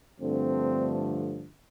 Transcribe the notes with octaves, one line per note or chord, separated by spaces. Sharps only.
G2 D3 F3 A3 C4